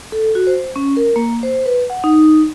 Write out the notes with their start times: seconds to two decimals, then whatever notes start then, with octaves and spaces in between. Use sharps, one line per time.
0.12 A4
0.35 F#4
0.47 C5
0.76 C#4
0.97 A#4
1.16 A#3
1.43 C5
1.66 B4
1.90 F#5
2.04 D#4